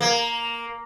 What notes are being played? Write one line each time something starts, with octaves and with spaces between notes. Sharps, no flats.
A#3